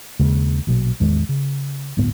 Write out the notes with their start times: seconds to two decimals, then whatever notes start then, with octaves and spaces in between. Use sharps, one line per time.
0.19 D#2 C#3 G#3
0.67 A#1 B2 F#3
1.00 A1 E2 D#3 G#3
1.29 C#3
1.97 G1 D2 A2 B3